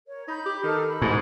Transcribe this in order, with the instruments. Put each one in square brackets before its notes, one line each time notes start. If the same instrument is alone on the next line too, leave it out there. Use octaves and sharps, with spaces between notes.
[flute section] A#4 C#5
[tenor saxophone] D#4 [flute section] B5 G6
[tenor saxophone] G4
[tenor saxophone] D#3 [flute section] D#4 A4 F6
[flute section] B5
[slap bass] G#2 [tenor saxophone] B2